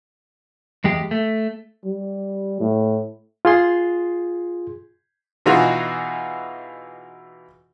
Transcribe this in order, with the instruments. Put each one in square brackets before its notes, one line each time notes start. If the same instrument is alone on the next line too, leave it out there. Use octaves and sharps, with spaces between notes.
[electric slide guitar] E2 G#3 G4
A3
[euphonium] G3
A2
[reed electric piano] F4 G#4 C6
[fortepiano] B2 E3 D#4 F4 F#4 G#4